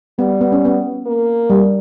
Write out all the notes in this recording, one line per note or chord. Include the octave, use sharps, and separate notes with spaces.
G3 B3
B3
C#4
B3
A#3
G3